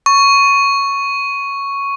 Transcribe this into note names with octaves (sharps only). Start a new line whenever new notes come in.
C#6